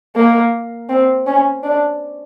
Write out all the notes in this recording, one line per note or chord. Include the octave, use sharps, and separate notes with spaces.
A#3
C4
C#4
D4